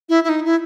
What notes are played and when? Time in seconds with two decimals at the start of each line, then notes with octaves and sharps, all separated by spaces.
0.09 E4
0.24 E4
0.29 D#4
0.45 E4